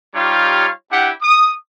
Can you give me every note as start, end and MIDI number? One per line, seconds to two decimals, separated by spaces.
0.15 0.69 55
0.15 0.69 63
0.15 0.69 65
0.15 0.69 67
0.15 0.69 73
0.15 0.69 77
0.92 1.11 62
0.92 1.11 64
0.92 1.11 67
0.92 1.11 78
0.92 1.11 79
1.23 1.51 87